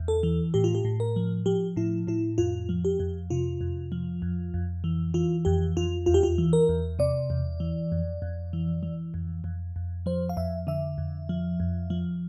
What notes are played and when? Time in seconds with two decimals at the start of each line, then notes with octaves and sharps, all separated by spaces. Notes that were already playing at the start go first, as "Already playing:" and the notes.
Already playing: E2
0.08 A4
0.23 E3
0.54 A2 G4
0.64 F4
0.75 G4
0.85 A2
1.00 A#4
1.16 F3
1.46 F3 G4
1.76 A2 E4
2.07 A2 E4
2.38 F2 F4
2.69 F3
2.85 G4
3.00 F2
3.30 C3 F4
3.61 F2
3.92 F3
4.22 F2
4.54 F2
4.84 E3
5.14 E3 F4
5.45 F2 G4
5.76 F2 F4
6.06 E2 F4
6.14 G4
6.23 F4
6.38 E3
6.53 A#4
6.69 E2
6.99 C3 D5
7.30 E2
7.60 E3
7.92 F2
8.22 F2
8.53 E3
8.83 E3
9.14 F2
9.44 F2
9.76 F2
10.06 F3 C5
10.29 F5
10.37 F2 E5
10.67 D3 E5
10.98 F2
11.29 F3
11.60 F2
11.90 F3